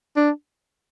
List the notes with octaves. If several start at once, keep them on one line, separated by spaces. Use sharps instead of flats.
D4